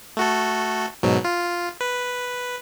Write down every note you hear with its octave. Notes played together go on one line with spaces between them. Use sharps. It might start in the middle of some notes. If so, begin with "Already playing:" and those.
A3 F#4 A4
G#2 B2 F#3
F4
B4